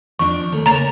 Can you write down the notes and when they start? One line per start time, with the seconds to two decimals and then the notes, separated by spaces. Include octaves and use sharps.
0.19 F3 C4 D4 C#6
0.52 D#2 A3 C#5
0.66 C#3 A#3 C#5 A#5 A6 F7